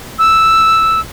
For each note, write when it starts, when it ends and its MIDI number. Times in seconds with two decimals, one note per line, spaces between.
0.19 1.00 88